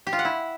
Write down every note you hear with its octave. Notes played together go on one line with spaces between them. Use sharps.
G4
F4
F#5
E4